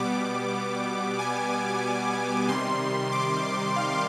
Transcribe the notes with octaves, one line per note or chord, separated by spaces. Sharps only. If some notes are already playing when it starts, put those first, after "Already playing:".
Already playing: B2 G3 B3 D6
G#5
C3 D#3 G3 C6
D6
F5